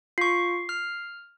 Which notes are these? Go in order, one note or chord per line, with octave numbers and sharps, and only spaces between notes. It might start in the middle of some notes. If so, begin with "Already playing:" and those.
F4 C#6 C7
F6